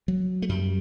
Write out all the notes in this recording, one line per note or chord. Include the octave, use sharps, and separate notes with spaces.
F#3
A3
F#2 G3